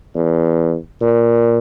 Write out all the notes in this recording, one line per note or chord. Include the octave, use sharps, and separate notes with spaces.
E2
A#2